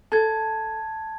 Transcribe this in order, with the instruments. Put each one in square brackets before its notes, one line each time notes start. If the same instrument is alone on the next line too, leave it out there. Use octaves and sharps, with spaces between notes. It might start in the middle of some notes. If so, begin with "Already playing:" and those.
[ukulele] A4 [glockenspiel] A5 G#6